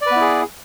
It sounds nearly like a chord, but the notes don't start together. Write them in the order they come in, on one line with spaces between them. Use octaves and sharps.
D5 B4 B3 E4 G#4